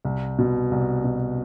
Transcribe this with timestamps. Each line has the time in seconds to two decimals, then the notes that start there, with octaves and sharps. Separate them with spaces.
0.05 C2
0.39 B2
0.71 C2
1.04 B2